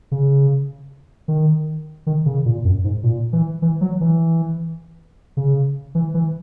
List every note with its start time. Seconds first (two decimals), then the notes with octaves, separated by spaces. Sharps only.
0.12 C#3
1.28 D#3
2.07 D#3
2.26 C#3
2.46 A#2
2.64 F#2
2.84 G#2
3.03 A#2
3.33 E3
3.62 E3
3.81 F#3
4.01 E3
5.37 C#3
5.95 E3
6.14 E3